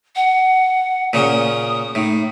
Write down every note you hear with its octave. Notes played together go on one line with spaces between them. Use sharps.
F#5
A#2 C#3 D#6
A2 D#4